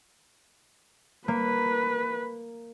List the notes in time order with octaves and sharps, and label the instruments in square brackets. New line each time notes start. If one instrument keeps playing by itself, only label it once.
[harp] A#3 [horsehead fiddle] B4